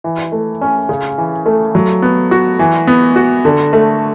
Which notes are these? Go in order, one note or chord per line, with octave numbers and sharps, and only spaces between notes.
E3
A3
C#4
C#3
E3
A3
F#3
B3
F#4
E3
B3
F#4
D3
A3